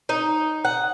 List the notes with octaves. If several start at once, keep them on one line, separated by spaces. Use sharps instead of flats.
D#4
F#5